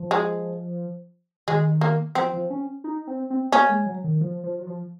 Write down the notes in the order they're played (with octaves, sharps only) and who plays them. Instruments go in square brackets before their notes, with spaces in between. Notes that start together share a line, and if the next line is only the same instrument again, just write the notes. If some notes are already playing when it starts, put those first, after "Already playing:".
Already playing: [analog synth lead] F3
[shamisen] G#3
[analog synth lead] D#3 [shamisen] G#3
[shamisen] A#3
[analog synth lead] F3 [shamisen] C4
[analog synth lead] F3
C#4
D#4
C4
C4
[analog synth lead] A#3 [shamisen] C#4
[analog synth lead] G#3
F#3
D#3
F3
F3
F#3
F3